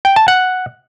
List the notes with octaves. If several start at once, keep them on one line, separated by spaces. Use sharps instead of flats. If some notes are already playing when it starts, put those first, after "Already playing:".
G5
A5
F#5